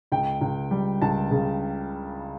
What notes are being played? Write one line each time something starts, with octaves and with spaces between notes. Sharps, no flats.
C#2 G5
C#2
G3
C#2 A5
C#3